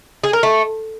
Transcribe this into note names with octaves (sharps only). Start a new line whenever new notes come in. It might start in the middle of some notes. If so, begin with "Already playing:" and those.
G#4
A#4
A3